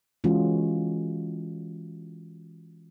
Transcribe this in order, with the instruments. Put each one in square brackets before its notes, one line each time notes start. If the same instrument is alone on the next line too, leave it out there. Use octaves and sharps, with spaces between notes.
[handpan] E3 G#3 C#4 F4 F#4